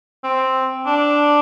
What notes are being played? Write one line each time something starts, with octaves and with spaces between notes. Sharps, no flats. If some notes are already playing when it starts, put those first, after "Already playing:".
C4
D4